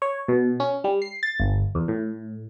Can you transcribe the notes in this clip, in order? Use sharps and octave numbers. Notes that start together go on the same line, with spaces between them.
C#5
B2
C#4
G3
C7
A6
G1
E2
A2